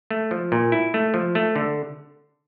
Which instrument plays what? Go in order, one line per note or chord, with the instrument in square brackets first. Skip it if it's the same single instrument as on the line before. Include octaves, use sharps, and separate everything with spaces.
[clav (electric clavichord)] A3
F3
A#2
E4
A3
F3
A3
D3